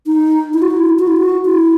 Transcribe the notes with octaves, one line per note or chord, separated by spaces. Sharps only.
D#4
E4
F#4
E4
F#4
E4
F#4
E4